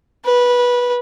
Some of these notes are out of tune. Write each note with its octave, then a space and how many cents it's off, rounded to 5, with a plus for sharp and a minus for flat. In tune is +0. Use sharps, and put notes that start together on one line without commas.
B4 -15